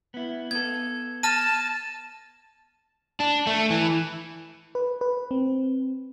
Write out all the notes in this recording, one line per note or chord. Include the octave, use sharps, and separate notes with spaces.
B3 E4
B3 A4 G#6
A5 F6 A#6 D#7
D4
A3
E3
B4
B4
C4